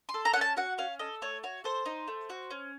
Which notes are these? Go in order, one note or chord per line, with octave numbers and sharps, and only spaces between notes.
C6
A4
A#5
C#4 F#5
A5
F#4 F#5
C#4 F5
A4 D#5
A3 C#5
F#4 C#5
A4 C5
D#4
A3
F#4
C#4